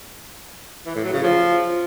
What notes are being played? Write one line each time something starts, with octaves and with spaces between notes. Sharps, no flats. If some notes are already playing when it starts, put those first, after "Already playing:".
E3
A2
F#3
C#3
F3